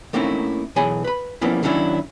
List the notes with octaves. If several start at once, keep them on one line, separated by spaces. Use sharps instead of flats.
A3 A#3 C4 C#4 D#4 E4
B1 E3 F#3 G#4 G#5 B5
B4 B5
F3 G3 A#3 B3 C#4 E4
D#3 F#3 C#4 D4 E4